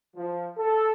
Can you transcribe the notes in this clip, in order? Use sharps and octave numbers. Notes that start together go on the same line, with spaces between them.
F3
A4